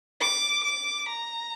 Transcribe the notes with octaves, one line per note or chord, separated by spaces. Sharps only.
D6
D6
A#5